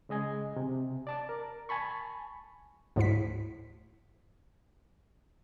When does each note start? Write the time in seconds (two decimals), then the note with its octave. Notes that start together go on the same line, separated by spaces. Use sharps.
0.09 C#3 G#3 D#5 G#5
0.56 C3
1.07 D5 A5 D6
1.29 A#4
1.69 G#5 A5 B5 C#6
2.96 D2 G#2 E4 B6